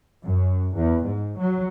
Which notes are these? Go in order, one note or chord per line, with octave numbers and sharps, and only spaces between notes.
F#2
E2
G#2
F#3